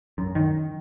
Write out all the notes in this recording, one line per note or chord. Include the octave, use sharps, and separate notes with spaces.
F#2
D#3